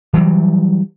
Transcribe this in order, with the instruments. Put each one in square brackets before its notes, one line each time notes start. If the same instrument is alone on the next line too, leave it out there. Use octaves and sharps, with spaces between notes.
[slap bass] E3 F#3 G3